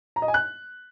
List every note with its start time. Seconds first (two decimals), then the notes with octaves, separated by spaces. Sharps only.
0.16 A#5
0.22 D#5
0.28 G#5
0.34 F#6